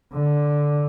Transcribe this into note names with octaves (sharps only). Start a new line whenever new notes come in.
D3